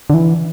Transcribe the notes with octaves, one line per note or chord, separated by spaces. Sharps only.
D3
E3